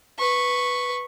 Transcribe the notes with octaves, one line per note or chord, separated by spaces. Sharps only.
B4 C#6